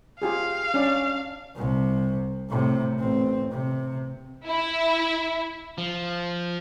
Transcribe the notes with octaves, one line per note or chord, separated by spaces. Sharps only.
F4 G4 G#4 F5
C#4 D4 D5
C2 C3
A2 C3
A1 C4
C3
E4
F3